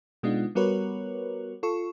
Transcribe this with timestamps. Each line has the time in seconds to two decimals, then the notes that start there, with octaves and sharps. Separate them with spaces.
0.23 B2 G#3 B3 D4 D#4 F4
0.55 G3 B3 F#4 A#4 B4 C#5
1.63 F4 A4 C#6